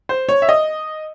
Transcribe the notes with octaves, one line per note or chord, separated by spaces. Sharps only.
C5
C#5
E5
D#5